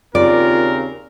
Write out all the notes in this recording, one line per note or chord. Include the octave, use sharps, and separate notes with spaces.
D#2 C#3 C4 F4 A#4 D5